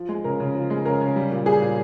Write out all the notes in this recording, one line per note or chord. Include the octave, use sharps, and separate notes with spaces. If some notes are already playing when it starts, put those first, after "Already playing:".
Already playing: F3
G#3
C#3 A#4
C#3
F3
G#3
C#3 A#4
C#3
G3
A#2
G3 G#4
A#2